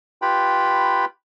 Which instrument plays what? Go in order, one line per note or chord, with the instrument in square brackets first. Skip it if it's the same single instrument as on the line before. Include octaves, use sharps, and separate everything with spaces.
[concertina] F4 G4 B4 G5 B5